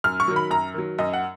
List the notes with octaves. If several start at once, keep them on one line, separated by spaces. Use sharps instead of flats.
F#2 F6
C#6
D#3 F#3
B5
F#2 A#5
D#3 F#3
F#2 D#5
F#5